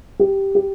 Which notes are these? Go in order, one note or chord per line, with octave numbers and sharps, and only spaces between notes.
G4
G4